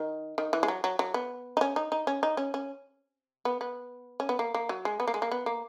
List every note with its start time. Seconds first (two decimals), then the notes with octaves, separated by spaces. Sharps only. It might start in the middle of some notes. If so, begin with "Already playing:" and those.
Already playing: D#3
0.38 D#3
0.53 E3
0.63 G#3
0.68 F#3
0.84 F#3
0.99 F#3
1.14 B3
1.57 D#4
1.61 C#4
1.76 D#4
1.92 D#4
2.07 C#4
2.23 D#4
2.37 C#4
2.54 C#4
3.45 B3
3.61 B3
4.20 C#4
4.29 B3
4.39 A#3
4.54 A#3
4.69 F#3
4.85 G#3
5.00 B3
5.08 A#3
5.14 G#3
5.22 A#3
5.31 B3
5.46 A#3